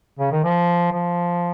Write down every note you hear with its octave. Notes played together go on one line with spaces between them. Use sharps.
C#3
D#3
F3
F3